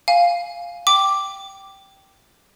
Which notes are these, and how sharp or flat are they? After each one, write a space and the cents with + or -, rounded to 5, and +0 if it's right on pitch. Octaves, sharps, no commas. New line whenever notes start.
F5 +0 G#5 +0
G5 -10 D6 +0